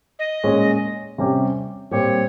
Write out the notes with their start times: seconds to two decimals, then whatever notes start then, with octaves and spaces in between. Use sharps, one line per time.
0.19 D#5
0.44 A#2 G#3 C#4 G#4 C#5
1.18 C3 G3 C#4 G4
1.91 A#2 G3 C4 G4 C#5